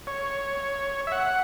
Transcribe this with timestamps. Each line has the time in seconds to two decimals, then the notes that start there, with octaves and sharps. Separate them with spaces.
0.07 C#5
1.07 E5
1.12 F#5